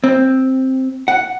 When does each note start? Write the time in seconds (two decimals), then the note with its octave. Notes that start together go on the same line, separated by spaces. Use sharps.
0.04 C4
1.08 F#5